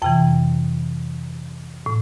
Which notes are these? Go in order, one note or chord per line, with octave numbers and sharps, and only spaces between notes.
F2 C3 E3 G5
A2